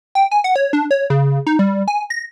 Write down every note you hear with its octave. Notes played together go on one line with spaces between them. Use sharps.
G5
G#5
F#5
C#5
D4
C#5
C#3
D#4
G3
G#5
A#6